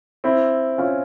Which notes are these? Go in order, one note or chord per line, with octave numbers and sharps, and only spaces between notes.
C4 E4
C#4 F4